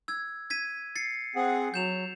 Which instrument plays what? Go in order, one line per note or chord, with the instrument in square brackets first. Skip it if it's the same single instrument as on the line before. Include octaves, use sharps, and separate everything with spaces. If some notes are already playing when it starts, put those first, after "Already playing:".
[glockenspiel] E6 G#6
G#6 B6 D#7
A6 C7 C#7
[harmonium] C4 G#4 F#5
[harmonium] F#3 [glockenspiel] G6 E7 F7